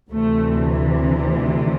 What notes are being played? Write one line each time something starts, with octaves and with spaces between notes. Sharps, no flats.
D2 C3 E3 A3